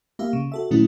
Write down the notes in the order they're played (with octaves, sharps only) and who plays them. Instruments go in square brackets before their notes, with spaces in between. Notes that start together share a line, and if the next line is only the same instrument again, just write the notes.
[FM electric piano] A#3 G4 E5 F5
C#3
F#4 A4 E5
A#2 D#3 F#3 A3 C#4 E4